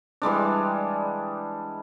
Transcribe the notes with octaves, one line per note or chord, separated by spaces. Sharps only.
E3 G3 G#3 D4